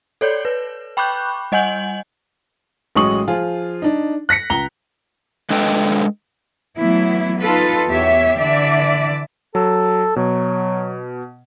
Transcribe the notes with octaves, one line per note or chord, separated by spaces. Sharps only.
A4 C#5 D5 G6
B4
G5 B5 C#6 D6 F#6 G6
G3 D#5 F#5 G#5 G6 F#7
A1 F#3 G#3 C#6 D#6 F#7
F3 F4 G#4
D4 D#4
F#6 A#6 B6 C#7
C#2 A#5 G7
G#3 D4 A4 B4 D#5 G5
E3 F#3 A3 B3 E4
D#4 F4 A4 B4
E2 B3 G4 C#5 E5
D3 E3 D5 E5
F#3 A4
B2 F#3